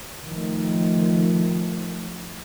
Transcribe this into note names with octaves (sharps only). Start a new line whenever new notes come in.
D#3 F3 A3